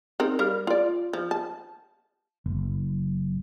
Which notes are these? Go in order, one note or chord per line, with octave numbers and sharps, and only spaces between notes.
C4 D#4 A#4
G3 A#4 F5
F4 D5
F3
A5
F#1